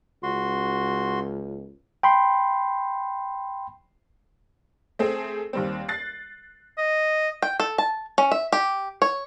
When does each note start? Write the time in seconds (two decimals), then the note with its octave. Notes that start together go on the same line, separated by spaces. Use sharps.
0.23 C#2 F#4 C6
2.03 G5 B5 C6
4.99 A3 C4 G#4
5.53 D#2 G3 C4
5.89 F#6 A6 C7
6.78 D#5
7.42 G5
7.60 A4
7.78 A5
8.18 C#4
8.32 E5
8.52 G4
9.02 C#5